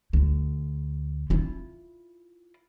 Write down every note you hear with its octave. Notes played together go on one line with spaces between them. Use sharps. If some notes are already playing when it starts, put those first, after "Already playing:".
D2
E4 F4